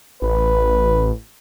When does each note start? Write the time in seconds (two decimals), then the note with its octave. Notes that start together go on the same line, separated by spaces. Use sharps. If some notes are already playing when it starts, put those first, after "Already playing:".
0.22 A1 B4